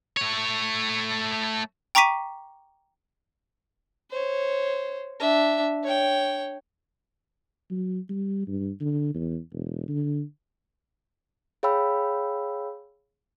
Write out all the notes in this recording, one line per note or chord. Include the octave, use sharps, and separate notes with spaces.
A3 C#5
G5 A#5 C#6 D6 B6 D#7
C5 C#5
D4 E5
C#5 G5
F#3
G3
G2
D3
E2
E1
D3
G#4 C#5 F5 G5 B5 E6